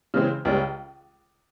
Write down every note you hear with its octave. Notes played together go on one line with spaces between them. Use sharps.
C#3 E3 G#3 C4
C#2 C#3 G3